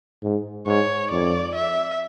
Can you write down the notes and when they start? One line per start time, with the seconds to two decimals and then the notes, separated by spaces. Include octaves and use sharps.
0.22 G#2
0.66 G#2 C#5
1.11 F2 D5
1.55 E5